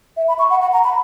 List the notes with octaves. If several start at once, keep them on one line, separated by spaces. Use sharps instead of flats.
E5
B5
C#6
F#5
F#5
A#5
B5